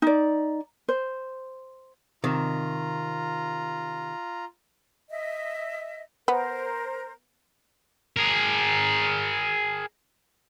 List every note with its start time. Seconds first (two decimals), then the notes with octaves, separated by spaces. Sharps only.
0.02 D#4 D5
0.89 C5
2.24 C3 D#3 F4 A#5
5.10 D#5 E5
6.28 B3 A#4 C5
8.16 G#4 A#4